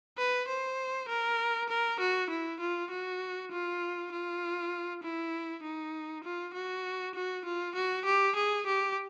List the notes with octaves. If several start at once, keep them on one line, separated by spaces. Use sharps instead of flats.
B4
C5
A#4
A#4
F#4
E4
F4
F#4
F4
F4
E4
D#4
F4
F#4
F#4
F4
F#4
G4
G#4
G4